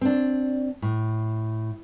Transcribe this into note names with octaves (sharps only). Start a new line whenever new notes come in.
C4 D4
A2